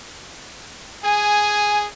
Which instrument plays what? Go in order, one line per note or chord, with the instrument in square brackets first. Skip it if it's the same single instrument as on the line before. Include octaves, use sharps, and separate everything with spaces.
[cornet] G#4 [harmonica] G#5